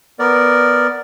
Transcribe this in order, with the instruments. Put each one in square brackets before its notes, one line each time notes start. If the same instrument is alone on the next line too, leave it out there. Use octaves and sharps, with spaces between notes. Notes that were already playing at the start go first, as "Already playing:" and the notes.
[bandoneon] B3 A#4 D5